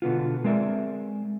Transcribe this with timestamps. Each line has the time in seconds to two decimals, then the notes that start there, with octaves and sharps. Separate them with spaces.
0.02 B2 D3 B3 F4
0.44 G#3 C4 A#4 D5 E5